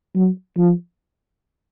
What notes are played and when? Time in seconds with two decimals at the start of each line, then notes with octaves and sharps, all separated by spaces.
0.15 F#3
0.58 F3